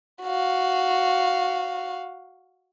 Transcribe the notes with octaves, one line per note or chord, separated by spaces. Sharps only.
F#4 F5